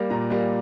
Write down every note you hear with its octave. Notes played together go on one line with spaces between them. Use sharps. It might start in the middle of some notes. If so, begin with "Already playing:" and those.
Already playing: G3 A#3
A#2 A#5
G3 A#3